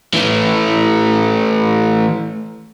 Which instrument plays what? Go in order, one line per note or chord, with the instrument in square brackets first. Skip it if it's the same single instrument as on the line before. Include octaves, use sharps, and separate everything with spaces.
[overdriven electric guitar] E3 A3